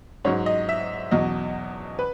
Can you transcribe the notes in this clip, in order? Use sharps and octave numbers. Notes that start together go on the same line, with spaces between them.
G#2 F#3 C#5
D#5
E5
E2 B2 F#3 D#5
B4